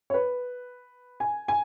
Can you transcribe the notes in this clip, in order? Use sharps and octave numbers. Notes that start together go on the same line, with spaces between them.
C#5
B4
G#5
G#5